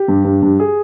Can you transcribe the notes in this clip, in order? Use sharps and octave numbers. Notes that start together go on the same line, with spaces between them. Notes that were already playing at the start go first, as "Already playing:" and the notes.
Already playing: G4
G2
G2
G2
G#4